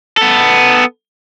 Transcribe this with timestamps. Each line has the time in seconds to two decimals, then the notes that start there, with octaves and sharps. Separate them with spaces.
0.17 B3 A4